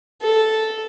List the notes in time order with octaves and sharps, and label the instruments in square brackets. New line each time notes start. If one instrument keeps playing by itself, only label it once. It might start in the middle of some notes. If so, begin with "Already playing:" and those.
[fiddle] A4